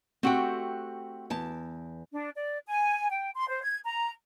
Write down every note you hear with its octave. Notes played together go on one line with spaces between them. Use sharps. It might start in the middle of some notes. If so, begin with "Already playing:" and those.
A3 C4 F#4 G4 G5
E2 A5
D4
D5
G#5
G5
C6
C5
G#6
A#5